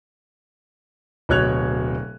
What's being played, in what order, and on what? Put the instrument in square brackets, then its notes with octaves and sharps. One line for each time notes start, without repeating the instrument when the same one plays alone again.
[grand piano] D1 B2 C#5 F#6 G#6 F7